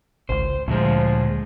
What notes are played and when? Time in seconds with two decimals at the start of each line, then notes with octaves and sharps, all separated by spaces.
0.29 G#1 C#2 C5
0.68 D2 A#2 F3 G#3